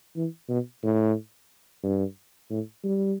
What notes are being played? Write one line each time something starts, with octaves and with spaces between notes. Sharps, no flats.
E3
B2
A2
G2
A2
G3